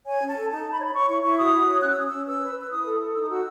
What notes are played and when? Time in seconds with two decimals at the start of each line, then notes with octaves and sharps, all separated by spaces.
0.06 C#5 G#5
0.21 C#4
0.29 A5
0.36 A4
0.50 D#4 A5
0.65 D#4
0.72 B5
0.80 C#5
0.86 B5
0.94 C#5 C#6
1.09 E4 C#6
1.24 E4 C#6
1.38 F#4 D#6
1.53 F#4
1.68 C#5
1.82 C#4 F#6
1.90 E6
1.97 C#4 D#6
2.06 E6
2.12 C#4
2.27 B4 E6
2.41 B4
2.56 B4 E6
2.71 E4 D#6
2.86 A4
3.00 A4
3.14 D#4 E6
3.22 D#6
3.29 F#4 E6